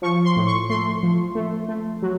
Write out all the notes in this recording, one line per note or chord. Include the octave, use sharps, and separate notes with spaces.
F3 C#6
C6
A2
C#6
A3 C6
F3
A3
A3
F#3